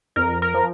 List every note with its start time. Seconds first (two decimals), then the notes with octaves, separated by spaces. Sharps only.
0.16 F2 A#4
0.42 A#4
0.54 F3